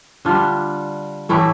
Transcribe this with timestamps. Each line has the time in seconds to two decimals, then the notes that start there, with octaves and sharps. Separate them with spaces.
0.25 D3 G3 D4 F4
1.29 A2 E3 A3 E4 G4